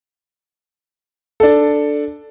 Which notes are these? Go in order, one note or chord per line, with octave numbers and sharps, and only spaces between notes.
D4 A4